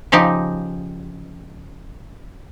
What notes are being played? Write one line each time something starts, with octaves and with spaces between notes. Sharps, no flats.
C#3 F3 D#4 G4